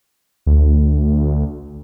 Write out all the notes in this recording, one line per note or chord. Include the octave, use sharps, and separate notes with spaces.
D2